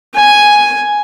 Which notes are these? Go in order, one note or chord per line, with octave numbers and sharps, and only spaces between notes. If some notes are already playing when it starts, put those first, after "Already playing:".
G#5